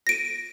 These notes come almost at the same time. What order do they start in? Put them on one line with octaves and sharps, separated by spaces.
A#6 D7 D#7